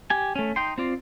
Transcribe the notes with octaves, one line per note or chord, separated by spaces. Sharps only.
G4 G#5
A3 C#4
D#4 G5 C6
C4 F4 D5